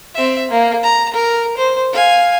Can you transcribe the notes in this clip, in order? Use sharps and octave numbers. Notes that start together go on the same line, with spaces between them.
C4 E5
A#3
A#5
A#4
C5
F5 G#5